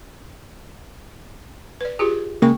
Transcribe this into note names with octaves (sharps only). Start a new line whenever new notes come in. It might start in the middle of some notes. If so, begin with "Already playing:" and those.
B4 D5
F4 G4 G#4
C#3 G#3 A#3 G5 C#6